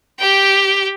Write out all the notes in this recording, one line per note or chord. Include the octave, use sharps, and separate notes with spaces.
G4 G5